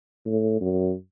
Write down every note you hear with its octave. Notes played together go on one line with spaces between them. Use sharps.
A2
F#2